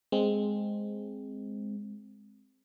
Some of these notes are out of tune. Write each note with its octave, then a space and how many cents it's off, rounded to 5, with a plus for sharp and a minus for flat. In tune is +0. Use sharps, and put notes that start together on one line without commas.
G#3 +0 C4 +0